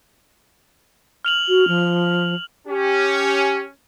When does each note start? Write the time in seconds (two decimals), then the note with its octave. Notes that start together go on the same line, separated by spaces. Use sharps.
1.25 F6 F7 F#7
1.48 F#4
1.67 F3
2.67 C#4 G4